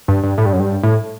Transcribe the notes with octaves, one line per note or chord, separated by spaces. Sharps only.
G2
G2
A2
G2
F#2
G2
A2